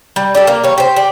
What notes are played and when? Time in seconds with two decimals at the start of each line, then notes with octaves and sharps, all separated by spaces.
0.16 G3
0.35 D4 G4 A4
0.47 A#3
0.64 G3 C#5
0.78 G4 C5
0.96 G4 D5